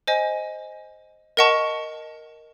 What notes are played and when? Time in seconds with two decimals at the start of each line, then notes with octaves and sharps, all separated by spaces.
0.07 C5 D#5 G#5
1.37 A#4 D#5 F#5 A5 C#6